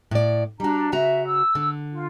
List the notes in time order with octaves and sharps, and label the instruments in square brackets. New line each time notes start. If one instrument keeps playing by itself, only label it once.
[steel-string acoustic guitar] A2 D5
[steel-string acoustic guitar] G3 F#4 [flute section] D4 A#5
[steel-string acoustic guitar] C#3 F#4 A#5 [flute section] E5
[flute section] E6
[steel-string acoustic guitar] D3
[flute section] F4